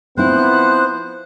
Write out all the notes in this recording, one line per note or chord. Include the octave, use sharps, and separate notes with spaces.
F3 B3 C4 E4 C5 F#6